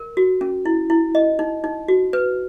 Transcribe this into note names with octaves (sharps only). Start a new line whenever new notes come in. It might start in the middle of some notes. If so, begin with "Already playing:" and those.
Already playing: A#4
F#4
C#4
E4
E4
D#5
D#4
D#4
F#4
B4